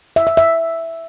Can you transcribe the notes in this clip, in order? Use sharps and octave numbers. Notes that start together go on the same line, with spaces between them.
E5
E5
E5